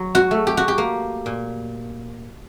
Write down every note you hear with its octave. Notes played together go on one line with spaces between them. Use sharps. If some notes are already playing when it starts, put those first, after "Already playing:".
Already playing: F#3
F#4
A3
G4
F#4
G4
A#3
A#2